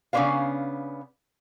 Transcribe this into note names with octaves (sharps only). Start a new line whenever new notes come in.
C#3 B3 C#4 D4 C5 F5